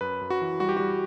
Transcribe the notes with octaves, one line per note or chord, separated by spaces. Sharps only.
F#2 B4
F#2
F#4
E3
G3 F#4
G4
G3 F#4